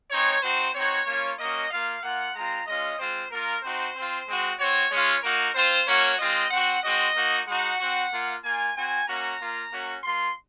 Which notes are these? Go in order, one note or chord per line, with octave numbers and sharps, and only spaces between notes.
G#3 C4 D#4 C#5
C4 D#4 F#4 C5
C4 D#4 F#4 C#5
A#3 C#4 F4
A#3 C#4 F#4 D#5
A#3 F4 F5
A#3 F4 F#5
G#3 C4 F4 A#5
G#3 C#4 F4 D#5
G#3 C4 F4 C5
A#3 F4 A#4
C4 D#4 F#4 C5
C4 F4
G#3 C4 F#4
C4 F#4 C#5
G#3 C#4 F4 C#5
A#3 D#4 F#4 A#4
C4 F4 C5
A#3 C#4 F#4 C#5
G#3 C4 F4 D#5
C4 F#4 F#5
G#3 C4 F#4 D#5
A#3 D#4 F#4
G#3 D#4 F#4 F#5
C4 F#4
A#3 F4
A#3 F4 G#5
C4 F#4 G#5
A#3 C#4 F#4 A#5
A#3 F4
A#3 C#4 F#4
A#3 F4 C6